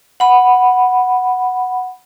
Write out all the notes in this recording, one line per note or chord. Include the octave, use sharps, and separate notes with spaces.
F#5 B5